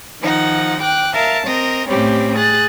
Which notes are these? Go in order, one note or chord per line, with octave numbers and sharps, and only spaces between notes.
D#3 F3 D#4 F#5
G5 D6 F#6
A#4 E5 F5 A5
C4 A#4 D#5
A2 G3 C4 C#4 G4
G#4 F#6 A6